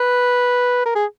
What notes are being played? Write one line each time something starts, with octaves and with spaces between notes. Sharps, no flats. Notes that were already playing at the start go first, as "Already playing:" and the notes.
Already playing: B4
A#4
G#4